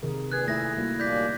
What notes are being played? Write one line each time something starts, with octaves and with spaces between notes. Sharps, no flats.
C3 D#3 G#4 A#4
A#2 G#4 B4 F#6 G#6
A3 E4 E5 A#6
G3 A#3 F#4
D#2 A#2 D5 G6 B6